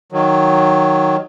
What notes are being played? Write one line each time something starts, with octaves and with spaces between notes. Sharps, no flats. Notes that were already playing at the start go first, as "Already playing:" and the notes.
D#3 F#3